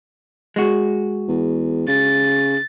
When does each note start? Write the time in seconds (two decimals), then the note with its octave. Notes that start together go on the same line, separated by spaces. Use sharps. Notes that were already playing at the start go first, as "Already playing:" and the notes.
0.56 G#3 F#4
1.29 E2
1.88 C#3 A6